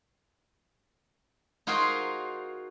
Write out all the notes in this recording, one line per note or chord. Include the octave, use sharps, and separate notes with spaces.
D#4 F4 F#4 G#4 A#4 C5